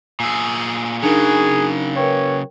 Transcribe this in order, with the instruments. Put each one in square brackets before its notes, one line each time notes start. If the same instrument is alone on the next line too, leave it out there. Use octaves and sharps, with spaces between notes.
[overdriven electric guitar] A#2 G#4 [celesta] G#5 E6
[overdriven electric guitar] C#3 F#3 [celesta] D4 D#4 A#4 [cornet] G#4
[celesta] A#4 B4 G5 [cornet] C#5